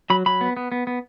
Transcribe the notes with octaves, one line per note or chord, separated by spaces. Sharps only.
F#3 B5
F#3 B5
B3
B3
B3
B3